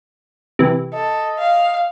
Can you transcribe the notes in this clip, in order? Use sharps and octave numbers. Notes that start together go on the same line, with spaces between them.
C3 E3
A4 D#5
F5